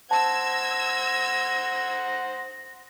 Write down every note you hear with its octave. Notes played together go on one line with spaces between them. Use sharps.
C5 F#5 A5 E6 G#6 A#6